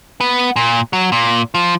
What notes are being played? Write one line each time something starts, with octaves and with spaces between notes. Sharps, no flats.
B3
A#2
F#3
A#2
F3